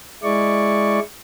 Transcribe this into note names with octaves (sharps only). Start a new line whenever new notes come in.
G#3 E4 D5 C#6